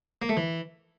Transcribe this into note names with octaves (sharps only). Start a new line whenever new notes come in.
A#3
A3
E3